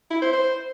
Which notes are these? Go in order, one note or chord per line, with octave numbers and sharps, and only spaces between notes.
E4
C5
C5